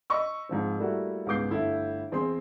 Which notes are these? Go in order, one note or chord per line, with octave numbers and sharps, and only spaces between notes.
D#5 B5 C#6 E6
G#2 F3 C4
G3 A3 A#3 E4 F#4
C#2 G#2 B3 D6 G6 C7
G1 A3 E4
E2 C4 G#4 C6